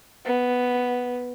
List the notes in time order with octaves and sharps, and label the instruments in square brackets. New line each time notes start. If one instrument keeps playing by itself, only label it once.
[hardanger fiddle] B3